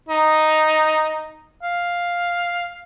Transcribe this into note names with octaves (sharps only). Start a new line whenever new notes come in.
D#4
F5